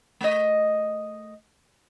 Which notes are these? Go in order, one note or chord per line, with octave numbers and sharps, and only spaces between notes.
A3 D#5